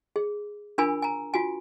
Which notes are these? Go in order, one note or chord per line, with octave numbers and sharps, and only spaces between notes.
G#4
D4 F4 A#4 G#5 B5
G#5 A#5
F4 F#4 G#5